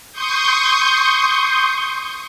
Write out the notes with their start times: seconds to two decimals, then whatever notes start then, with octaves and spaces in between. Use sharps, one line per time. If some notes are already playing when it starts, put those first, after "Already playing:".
0.13 C6 C#6 D#6 G6